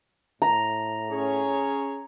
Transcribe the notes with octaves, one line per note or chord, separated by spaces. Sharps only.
A2 A#5
C#4 G#4 C#5